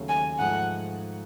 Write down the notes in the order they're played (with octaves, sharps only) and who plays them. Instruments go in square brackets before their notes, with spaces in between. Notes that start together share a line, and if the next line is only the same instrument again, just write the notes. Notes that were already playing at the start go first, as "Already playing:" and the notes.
Already playing: [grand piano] D#2 C#3 F#3 A3
[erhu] G#5
[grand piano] G#2 F3 A3 [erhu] F#5